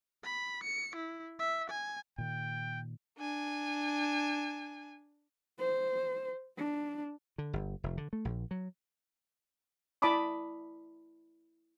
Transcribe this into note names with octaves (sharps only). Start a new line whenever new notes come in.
B5
C#7
E4
E5
G#5
A#2 D#3 G5
D4 G#5
C5
D4
D3
G1
F1
D3
A3
A#1
F#3
E4 D5 A5 B5 D6 D#6